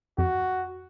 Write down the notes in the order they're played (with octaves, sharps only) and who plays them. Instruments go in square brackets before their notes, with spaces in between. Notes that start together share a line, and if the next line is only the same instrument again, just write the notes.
[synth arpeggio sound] F2 [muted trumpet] F#4